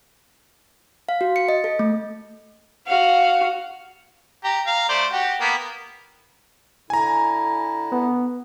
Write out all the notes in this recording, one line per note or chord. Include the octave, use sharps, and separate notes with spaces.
F5
F#4
C#7
D#5
A4
A3
F#4 F5
G4 A#5
F5 A#5
A3 C5 D5
F#4 G4
A#3 B3
D3 E4 G#5 A#5
B3